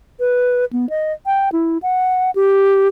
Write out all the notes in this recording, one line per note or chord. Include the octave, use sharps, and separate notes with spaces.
B4
B3
D#5
G5
E4
F#5
G4